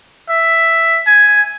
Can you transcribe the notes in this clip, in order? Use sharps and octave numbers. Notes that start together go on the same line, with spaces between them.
E5
G#5